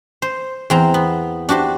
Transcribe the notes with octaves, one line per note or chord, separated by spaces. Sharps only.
C5
E2 C4 A#5
B3
D4 F#4 G4 C5